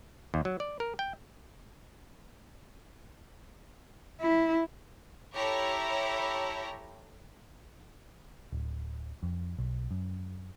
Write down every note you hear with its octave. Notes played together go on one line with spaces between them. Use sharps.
D#2
F#3
D5
A#4
G5
E4
E4 G4 A4 C#5 A#5
D1
F2
B1
F#2